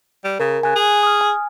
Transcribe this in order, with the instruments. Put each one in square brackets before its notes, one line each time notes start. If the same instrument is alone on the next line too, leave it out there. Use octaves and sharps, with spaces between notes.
[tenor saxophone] G3
[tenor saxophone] C#3 [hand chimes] A#4
[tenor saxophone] C#3 [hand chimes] G#5 F#6
[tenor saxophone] G#4
[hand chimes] D#6 F6
G#5